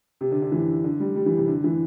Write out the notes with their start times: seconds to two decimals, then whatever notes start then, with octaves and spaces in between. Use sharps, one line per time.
0.21 C3
0.31 D3
0.42 D3
0.52 E3
0.84 D3
1.00 G3
1.15 G3
1.26 E3
1.37 C3
1.48 D3
1.64 E3